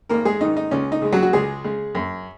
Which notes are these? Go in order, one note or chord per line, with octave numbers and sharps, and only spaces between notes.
G#1 A#3 A#4
G#3 G#4
G#2 D#3 D#4
D#4
C#2 C#4
D#4
C#3 G#3
F#3 F#4
F#4
C#2 G#3 G#4
C#3 G#3
F#2